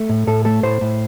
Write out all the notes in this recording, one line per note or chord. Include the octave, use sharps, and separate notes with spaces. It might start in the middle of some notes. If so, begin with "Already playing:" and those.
Already playing: A3
A2
A2 A4
A3 A4
A2 C5
A2